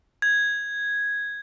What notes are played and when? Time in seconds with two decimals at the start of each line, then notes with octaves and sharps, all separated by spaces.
0.22 G#6